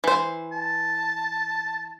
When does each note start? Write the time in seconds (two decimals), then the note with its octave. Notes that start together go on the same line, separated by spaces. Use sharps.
0.04 E3 C5
0.52 A5